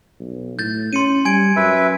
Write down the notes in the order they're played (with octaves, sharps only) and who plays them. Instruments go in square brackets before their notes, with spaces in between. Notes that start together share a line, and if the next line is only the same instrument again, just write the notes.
[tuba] B1
[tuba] A2 [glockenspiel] G6 A6
[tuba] C#4 [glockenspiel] C6 C#7 D#7
[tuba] G3 [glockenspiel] G#5 G#6 D7
[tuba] F#2 [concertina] B4 E5